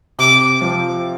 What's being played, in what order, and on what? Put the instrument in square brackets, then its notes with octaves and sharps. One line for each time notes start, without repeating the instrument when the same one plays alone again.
[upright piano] C3 [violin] D6
[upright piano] F3 C4